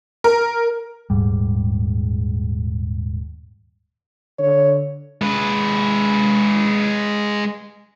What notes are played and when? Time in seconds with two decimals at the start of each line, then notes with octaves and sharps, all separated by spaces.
0.24 A#4
1.10 D#1 G#2 G3
4.39 D3 C#5
5.22 G#3 B4